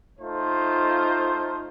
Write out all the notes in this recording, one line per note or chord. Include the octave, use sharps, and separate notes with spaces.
A3 D#4 F4 C5